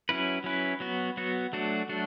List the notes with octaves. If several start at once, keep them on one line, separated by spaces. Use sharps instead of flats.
F#3 C#4 E4 B4
F#3 C#4 E4 B4
F#3 B3 F#4
F#3 B3 F#4
F#3 A3 D4 F#4
F#3 A3 D4 F#4